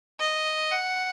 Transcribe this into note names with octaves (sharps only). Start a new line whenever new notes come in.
D#5
F#5